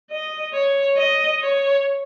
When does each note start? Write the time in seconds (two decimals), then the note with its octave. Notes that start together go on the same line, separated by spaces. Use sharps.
0.10 D#5
0.53 C#5
0.97 D#5
1.40 C#5